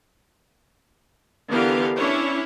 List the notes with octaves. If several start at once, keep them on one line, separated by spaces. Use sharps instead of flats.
D3 E3 B3 G4 A#4 F5
C#4 D4 E4 C#5